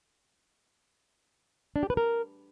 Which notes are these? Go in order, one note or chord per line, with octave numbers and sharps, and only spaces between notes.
D4
G4
B4
A#4